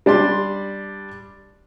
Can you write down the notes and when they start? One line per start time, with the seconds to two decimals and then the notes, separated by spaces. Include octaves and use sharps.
0.06 G3 D4 D5 C6